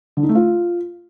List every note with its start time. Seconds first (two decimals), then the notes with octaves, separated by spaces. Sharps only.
0.17 D3
0.23 D#4
0.29 A3
0.35 F4